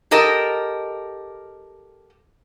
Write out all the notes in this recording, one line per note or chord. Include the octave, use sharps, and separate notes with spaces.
G4 A4 A#4 D#5